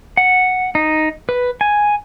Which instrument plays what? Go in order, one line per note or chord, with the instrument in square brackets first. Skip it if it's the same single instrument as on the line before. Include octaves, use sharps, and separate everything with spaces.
[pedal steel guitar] F#5
D#4
B4
G#5